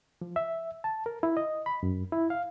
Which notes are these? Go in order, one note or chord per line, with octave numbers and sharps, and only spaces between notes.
F3
E5
A5
A#4
E4
D#5
B5
F#2
E4
F5